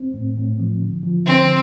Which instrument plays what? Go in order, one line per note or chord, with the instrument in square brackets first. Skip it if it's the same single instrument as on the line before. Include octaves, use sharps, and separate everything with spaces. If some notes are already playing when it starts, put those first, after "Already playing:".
Already playing: [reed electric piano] C4
A2
A2
F3
D3
F3
[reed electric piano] D3 [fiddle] C4